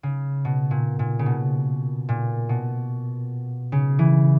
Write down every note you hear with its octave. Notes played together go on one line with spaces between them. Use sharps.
C#3
B2
A#2
A#2
C#3
B2
A#2
B2
C#3
E3